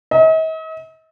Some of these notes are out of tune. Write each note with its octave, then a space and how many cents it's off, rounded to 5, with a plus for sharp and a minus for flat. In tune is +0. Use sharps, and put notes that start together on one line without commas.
D#5 +45